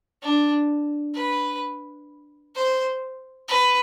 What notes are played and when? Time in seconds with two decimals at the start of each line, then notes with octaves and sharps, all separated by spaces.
0.23 D4
1.15 B4
2.55 C5
3.49 B4